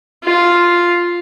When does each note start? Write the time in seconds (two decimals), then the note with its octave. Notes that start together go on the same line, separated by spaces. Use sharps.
0.24 F4